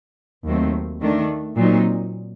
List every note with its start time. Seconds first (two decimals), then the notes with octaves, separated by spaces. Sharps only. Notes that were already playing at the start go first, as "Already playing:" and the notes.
0.46 D#2 D#3 F#3 A3 C4
1.02 D#3 A3 D4
1.56 A#2 F#3 C4 D#4